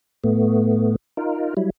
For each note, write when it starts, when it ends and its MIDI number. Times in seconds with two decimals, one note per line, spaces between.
0.24 0.96 45
0.24 0.96 57
0.24 0.96 59
1.17 1.54 63
1.17 1.54 65
1.17 1.54 70
1.57 1.70 54
1.57 1.70 55
1.57 1.70 64